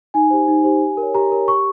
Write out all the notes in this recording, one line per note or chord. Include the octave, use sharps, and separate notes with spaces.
D#4 G#5
G4 C5
D#4
G4 C5
G4
A#4
C#5
G4 A#5
A#4 C#5
G4 C#6